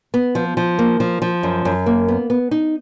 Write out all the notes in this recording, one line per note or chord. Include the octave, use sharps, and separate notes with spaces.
B3
F3
F3
A#3
F3
F3
F#2
F#2
A#3
B3
B3
D#4